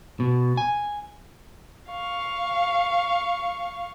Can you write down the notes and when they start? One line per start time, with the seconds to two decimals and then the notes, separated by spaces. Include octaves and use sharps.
0.20 B2
0.57 G#5
1.90 F5 C#6